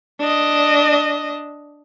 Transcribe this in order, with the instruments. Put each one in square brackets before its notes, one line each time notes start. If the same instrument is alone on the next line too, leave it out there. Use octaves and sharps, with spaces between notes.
[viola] D4 D#5